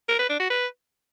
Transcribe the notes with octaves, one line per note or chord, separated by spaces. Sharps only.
A#4
B4
D4
F#4
B4